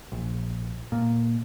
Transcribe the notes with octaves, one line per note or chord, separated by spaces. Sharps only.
A#1
A#2